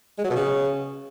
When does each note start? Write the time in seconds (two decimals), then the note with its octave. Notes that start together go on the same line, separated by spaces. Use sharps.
0.18 G#3
0.24 F#3
0.30 B2
0.36 C#3